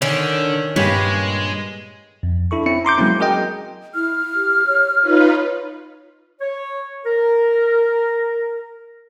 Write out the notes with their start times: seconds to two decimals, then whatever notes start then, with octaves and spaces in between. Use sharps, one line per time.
0.02 D3 D#3 C#4
0.76 G2 A#2 G#3 G4 B4 C#5 G#5
2.23 F2
2.51 D4 E4 A4 C#6
2.66 C4 C#4 E4 C#7
2.85 A#5 C6 D6 G6
2.98 F#3 G#3 A#3 C4 C#4 E4
3.20 F#4 G#4 A#4 D#5 G5
3.95 E4 F6
4.35 G4
4.67 C#5
5.02 D#4 F4 B4 C#5
6.40 C#5
7.04 A#4